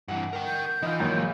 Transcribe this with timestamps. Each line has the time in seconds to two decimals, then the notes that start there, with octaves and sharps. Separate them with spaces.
0.08 G2 E3 F#5
0.33 A#4 G5
0.47 G6
0.82 E3 D#4 F4
1.00 F#2 A#2 D#3
1.17 A#1